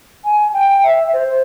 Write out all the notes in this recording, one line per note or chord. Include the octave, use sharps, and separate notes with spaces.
G#5
G5
E5
C5